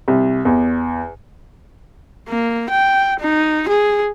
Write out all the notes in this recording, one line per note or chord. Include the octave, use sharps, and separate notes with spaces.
C2
E2
A#3
G5
D#4
G#4